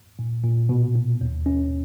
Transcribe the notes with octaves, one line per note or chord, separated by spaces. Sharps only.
A#2
A#2
B2
B2
D#2
C#4